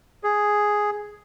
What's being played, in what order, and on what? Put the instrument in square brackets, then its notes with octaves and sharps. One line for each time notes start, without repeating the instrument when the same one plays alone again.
[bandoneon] G#4